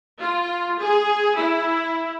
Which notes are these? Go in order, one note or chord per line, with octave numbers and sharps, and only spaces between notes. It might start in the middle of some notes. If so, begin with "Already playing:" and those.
F4
G#4
E4